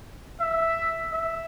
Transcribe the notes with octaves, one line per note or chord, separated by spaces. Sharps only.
E5
E5